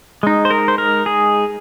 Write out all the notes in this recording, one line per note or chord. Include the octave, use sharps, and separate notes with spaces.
G#3 D#4
C5
A#4
C5
A#4
G#4